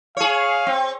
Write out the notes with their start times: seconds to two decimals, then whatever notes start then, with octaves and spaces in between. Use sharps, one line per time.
0.17 G#4 C#5 F5
0.67 C4